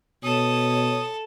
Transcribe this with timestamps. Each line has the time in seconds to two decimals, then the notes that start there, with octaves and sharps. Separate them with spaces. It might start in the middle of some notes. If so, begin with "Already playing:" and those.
0.23 B2 A4 C#5 D#6